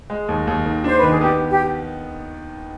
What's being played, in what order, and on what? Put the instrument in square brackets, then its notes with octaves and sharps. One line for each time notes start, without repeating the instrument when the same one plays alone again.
[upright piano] G#3
D#2
D#2
D#3
[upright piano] D4 [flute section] C5
[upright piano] D#3 [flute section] B4
[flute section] G#4
[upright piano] B3 [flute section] G4
[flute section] G4